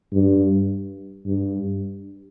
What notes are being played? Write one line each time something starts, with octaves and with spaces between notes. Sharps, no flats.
G2
G2